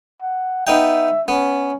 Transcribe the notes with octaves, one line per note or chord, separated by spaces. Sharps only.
F#5
B3 D#4 E5 G5
B3 C#4